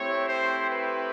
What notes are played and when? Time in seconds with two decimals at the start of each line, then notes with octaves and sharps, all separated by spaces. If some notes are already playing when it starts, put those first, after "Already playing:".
Already playing: A3 C4 E4 G4 C#5
0.29 C5
0.71 B4